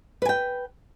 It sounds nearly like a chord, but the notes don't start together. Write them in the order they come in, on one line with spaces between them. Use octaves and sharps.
B4 G#5 G5